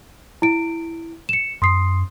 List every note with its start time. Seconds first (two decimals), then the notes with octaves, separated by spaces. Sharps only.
0.42 E4 D7
1.29 C#7 E7
1.62 F#2 C6 D#6 C7